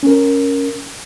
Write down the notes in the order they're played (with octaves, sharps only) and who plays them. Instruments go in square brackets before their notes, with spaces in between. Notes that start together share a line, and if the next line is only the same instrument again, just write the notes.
[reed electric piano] C#4 A#4